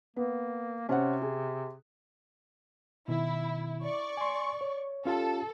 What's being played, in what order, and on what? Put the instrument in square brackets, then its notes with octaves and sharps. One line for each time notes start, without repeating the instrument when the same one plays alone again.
[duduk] A#3 [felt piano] B3
[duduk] C3 [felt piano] C#4 C5 F#5
[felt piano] G#4
[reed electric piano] B2 D#3 [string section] E4
[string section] D5 C#6
[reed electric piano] G#5 C6
C#5
[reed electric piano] C#4 F4 G4 [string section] A4